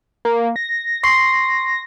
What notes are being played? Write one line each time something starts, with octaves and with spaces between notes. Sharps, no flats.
A#3
A#6
C6 C#6 C7